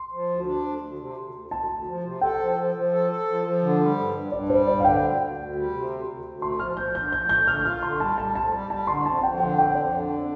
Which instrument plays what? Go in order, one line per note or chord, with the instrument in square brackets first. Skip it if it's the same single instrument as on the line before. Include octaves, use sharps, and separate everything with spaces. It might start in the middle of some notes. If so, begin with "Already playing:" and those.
Already playing: [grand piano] C6
[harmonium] F3
D2
D4
D2
D2
C3
D2
D2
[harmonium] D2 [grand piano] A5
[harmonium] D2
F3
C3
[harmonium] A4 [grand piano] G5
[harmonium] F3
F3
F3
A4
A4
F3
F3
D3
G3
G2
G2
[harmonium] G2 [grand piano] D5
[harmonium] G3 [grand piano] C5
[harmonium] G2 [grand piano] D5
[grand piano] F5
[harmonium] D3 [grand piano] G5
[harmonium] D2
D2
D2
G3
C3
D2
D2
D2
[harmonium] A3 [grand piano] C6
[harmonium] F3 [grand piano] F6
[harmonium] F3 [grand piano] G6
[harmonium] D3 [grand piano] G6
[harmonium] F3 [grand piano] G6
[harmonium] A3 [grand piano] G6
[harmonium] D3 [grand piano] F6
[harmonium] F4 [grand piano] F6
[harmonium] D3 [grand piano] C6
[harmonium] G3 [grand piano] A5
[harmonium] G3 [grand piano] A5
[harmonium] F2 [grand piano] A5
[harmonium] G3
[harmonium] G3 [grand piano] A5
[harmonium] D3 [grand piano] C6
[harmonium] F2 [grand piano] A5
[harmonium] F2 [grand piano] G5
[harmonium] D3 [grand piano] G5
[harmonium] F2 [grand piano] G5
[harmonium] F2 [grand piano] D5
[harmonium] D3
F2